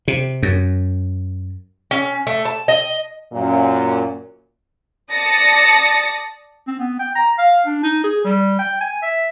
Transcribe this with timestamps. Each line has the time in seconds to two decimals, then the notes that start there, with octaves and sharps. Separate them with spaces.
0.08 C3
0.43 F#2
1.91 C#4
2.27 A3
2.45 A5
2.68 D#5
3.33 F#2 A#2
5.12 D5 A5 D#6 A6 A#6 C#7
6.67 C4
6.79 B3
6.99 G5
7.15 A#5
7.38 F5
7.66 D4
7.83 D#4
8.04 G#4
8.24 G3
8.58 G5
8.81 G#5
9.02 E5